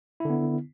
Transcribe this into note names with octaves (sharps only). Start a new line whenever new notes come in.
D3 B3 E4